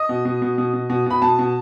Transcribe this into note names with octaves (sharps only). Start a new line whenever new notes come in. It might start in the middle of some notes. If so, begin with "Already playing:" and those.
Already playing: D#5
B2
B2
B2
B2
B2
B2
B2 B5
B2 A5
B2